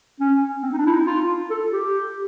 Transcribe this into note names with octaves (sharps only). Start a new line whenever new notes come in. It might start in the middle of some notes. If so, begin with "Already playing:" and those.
C#4
C4
D#4
D4
E4
D#4
F4
A4
G4